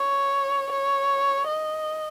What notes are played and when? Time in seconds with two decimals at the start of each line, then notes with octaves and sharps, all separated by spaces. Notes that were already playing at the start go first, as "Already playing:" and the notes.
Already playing: C#5
0.71 C#5
1.48 D#5